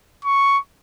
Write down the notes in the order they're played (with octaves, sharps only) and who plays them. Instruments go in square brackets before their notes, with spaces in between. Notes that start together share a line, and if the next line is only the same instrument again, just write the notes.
[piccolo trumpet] C#6